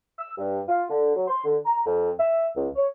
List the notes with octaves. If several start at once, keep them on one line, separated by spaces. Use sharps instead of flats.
E6
G2
F4
D3
F#3
C6
D3
A#5
F2
E5
C#2
C#5